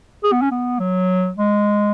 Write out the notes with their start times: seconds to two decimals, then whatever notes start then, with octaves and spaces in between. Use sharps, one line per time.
0.24 G#4
0.32 B3
0.42 C#4
0.51 B3
0.79 F#3
1.37 G#3